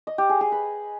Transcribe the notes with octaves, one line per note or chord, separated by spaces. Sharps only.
D#5
G4
G#4
G#4
B4